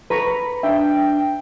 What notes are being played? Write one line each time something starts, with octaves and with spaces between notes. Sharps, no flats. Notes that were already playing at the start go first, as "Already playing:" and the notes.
A4 B4 A#5 B5 C#6
D4 E5 G5